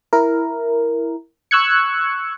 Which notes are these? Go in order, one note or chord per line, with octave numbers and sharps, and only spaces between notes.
E4 A#4
C#6 E6 F#6 G#6 C#7